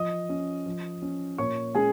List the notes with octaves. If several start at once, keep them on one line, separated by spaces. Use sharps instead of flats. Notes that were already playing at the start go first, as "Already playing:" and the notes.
Already playing: F3 D#5 D#6
C#4
F3
C#4
A#2 C#5 C#6
G#3 C#4 G#4 G#5